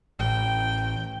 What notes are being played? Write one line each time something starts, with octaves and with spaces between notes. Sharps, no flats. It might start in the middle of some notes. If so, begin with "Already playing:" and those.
A1 G5